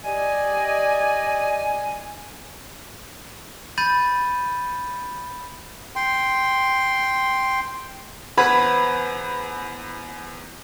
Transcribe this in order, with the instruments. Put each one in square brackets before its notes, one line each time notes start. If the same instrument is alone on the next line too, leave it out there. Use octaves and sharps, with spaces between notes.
[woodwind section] G4 D5 D#5 G#5
[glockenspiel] B5 G6 A6 D#7
[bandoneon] G5 C6
[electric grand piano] E2 [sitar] B4 [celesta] C5 F#5 G#6 [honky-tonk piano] B5